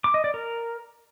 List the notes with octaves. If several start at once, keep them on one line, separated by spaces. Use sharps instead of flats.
D6
D#5
D5
A#4